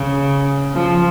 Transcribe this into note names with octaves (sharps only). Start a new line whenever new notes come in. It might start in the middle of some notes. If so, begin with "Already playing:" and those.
Already playing: C#3
F3